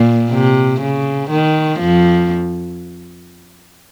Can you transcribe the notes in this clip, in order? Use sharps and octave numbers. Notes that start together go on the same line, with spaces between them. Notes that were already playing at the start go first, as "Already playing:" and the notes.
Already playing: A#2
C3
C#3
D#3
F2 F3